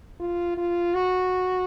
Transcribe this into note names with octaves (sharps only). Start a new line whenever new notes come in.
F4
F4
F#4